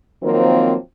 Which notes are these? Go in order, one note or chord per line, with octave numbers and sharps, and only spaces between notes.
D#3 F3 F#3 A#3 C4